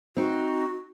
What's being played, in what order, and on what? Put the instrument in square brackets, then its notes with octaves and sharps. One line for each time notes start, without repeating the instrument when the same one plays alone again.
[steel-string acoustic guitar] C4 D#4 [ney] F#4